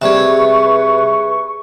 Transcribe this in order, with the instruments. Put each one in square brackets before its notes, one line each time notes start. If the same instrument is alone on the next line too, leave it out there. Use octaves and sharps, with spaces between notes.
[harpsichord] C3 G3 [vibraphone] G#4 E5 [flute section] B4 C#6